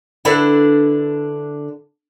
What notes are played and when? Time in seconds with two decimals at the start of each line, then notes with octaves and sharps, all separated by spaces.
0.25 D3 D4 E4 A4 B4